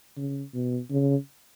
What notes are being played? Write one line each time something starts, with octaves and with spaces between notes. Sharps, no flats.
C#3
B2
C#3